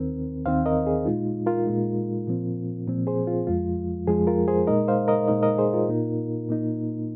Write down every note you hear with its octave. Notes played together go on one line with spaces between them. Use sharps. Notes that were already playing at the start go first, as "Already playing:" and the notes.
Already playing: D#2 D#3 C4 A#4
D#2 D#3 C4 C5 F5
A#4 D#5
G#4
A#2 G#3 D#4 F4
F4 A#4
A#2 G#3 D#4
A#2 F3 C4
A#2 F3 C4
G#4 C5
F4
F2 F3 G#3 F4
F2 F3 G#3 F4 G#4
F4 A#4
G#4 C5
A#2 G#3 D#4 A#4 D#5
C5 F5
A#4 D#5
A#2 G#3 D#4 A#4 D#5
A#4 D#5
G#4 C5
F4 A#4
A#2 A#3 D#4
A#2 A#3 D#4